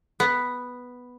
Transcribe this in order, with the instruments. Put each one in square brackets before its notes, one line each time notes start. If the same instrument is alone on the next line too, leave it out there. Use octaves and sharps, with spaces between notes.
[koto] B3